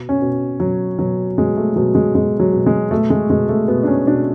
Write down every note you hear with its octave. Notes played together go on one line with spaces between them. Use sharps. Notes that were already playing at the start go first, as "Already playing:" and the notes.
Already playing: B2
C#4
B2
B2 F#3
B2 F#3
B2 G#3
A3
B2 F#3
G#3
B2 G#3
F#3
B2
G#3
B2 A3
G#3
B2 G#3
A3
B2 B3
D4
C#4
B2 D4